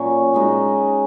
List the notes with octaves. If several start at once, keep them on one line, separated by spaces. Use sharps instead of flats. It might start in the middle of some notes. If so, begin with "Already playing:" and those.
Already playing: A#2 F#3 C#4 F#4
G#3 D#4 F#4 D#5